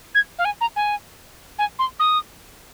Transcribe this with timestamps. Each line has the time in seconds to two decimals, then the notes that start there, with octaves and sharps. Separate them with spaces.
0.14 G#6
0.38 F5
0.45 G#5
0.60 A#5
0.76 G#5
1.58 G#5
1.79 C6
1.99 D#6